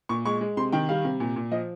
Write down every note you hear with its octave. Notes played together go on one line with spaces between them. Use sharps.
A#2 C#6
G#3 C#6
G#3
C3 C6
D#3 G5
G3 F5
C3
A#2
A#2
F3 D#5